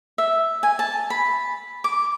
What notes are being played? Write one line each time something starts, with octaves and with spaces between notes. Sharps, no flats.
E5
G#5
A5
B5
D6